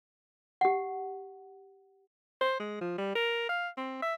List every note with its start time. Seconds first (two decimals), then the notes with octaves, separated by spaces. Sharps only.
0.61 G4 F#5
2.41 C5
2.60 G#3
2.81 F3
2.98 G3
3.15 A#4
3.49 F5
3.77 C4
4.02 E5